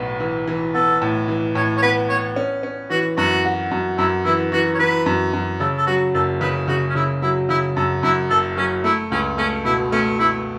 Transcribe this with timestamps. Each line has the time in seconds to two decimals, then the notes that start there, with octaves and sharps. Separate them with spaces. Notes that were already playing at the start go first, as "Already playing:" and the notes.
Already playing: B1 A2 B3
0.20 E3
0.47 E3
0.74 B3 A4
1.02 A2
1.28 E3
1.55 A2 C#5
1.77 C#5
1.82 B3 B4
2.09 B3 C#5
2.36 C#4
2.63 C#4
2.90 E3 F#4
3.17 F#2 F#4
3.45 F#4
3.71 F#2
3.98 F#2 E4
4.25 E3 E4
4.52 E3 F#4
4.74 C#5
4.79 E3 B4
5.06 F#2
5.33 F#2
5.60 C#3 A4
5.78 A4
5.87 F#3 F#4
6.14 F#1 A4
6.41 C#3 B4
6.68 C#3 F#4
6.89 C#4
6.95 C#3 E4
7.22 F#3 E4
7.49 C#3 E4
7.76 F#2 A4
8.03 F#2 E4
8.30 F#1 A4
8.57 F#3 C#4
8.84 A3 E4
9.11 C#2 C#4
9.38 A3 C#4
9.65 B2 E4
9.92 A3 C#4
10.19 A3 E4